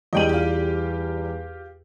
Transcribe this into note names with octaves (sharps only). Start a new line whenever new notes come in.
E2 G3 D#5 G5 D#7 F#7
F4 G4